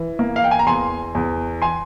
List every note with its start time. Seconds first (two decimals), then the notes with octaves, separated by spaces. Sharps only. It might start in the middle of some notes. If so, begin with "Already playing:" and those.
Already playing: E3
0.19 A#3
0.36 F5
0.44 G5
0.51 G#5
0.59 A#5
0.66 E2 G#5 C6
1.15 E2
1.62 G#5 C6